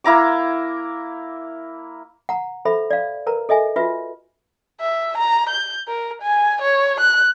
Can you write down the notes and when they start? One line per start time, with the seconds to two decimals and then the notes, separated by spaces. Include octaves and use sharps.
0.04 A#3 E4 A#5 D6
2.29 F#5 A#5
2.65 A4 C5 E5 B5
2.91 D5 F5
3.27 A#4 B4 A#5
3.49 A4 D#5 E5 G#5
3.76 F4 F#4 B4 E5
4.80 E5
5.17 A#5
5.50 G6
5.88 A#4
6.22 G#5
6.62 C#5
7.01 F#6